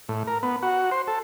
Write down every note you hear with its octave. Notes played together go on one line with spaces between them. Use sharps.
A2
A#4
B3
F#4
C5
A4